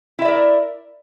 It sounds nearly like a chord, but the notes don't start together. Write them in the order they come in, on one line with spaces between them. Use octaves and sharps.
E4 E5 D5 A#4